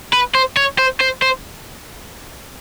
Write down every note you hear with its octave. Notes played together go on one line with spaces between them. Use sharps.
B4
C5
C#5
C5
C5
C5